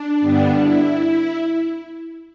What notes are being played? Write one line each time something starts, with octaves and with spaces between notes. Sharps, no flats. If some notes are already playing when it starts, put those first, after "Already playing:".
Already playing: D4
G2 D3 G3 B3
E4